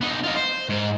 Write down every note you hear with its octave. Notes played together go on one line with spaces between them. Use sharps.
B3 D#4
F4 D#5
C5
G#2